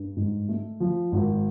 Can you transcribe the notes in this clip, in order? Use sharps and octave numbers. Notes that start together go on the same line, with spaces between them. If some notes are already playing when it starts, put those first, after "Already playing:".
Already playing: G2
G#2
A3
F3
G#1